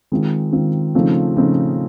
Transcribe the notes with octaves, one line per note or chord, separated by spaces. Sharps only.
D#3 G#3 C4 F4
D#3 G#3 C4 F4
C#3 F3 A3 C4 D#4
C#3 F3 A3 C4 D#4